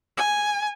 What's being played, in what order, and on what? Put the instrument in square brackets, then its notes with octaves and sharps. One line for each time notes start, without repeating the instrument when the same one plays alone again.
[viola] G#5